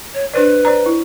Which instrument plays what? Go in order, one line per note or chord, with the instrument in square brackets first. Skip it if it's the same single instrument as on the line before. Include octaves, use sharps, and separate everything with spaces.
[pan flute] C#5
[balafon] D4 C5 D5 [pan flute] B4
[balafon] C5 D5 A#5
E4